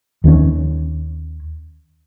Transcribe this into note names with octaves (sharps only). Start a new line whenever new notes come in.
D#2 D#3 G3 C#4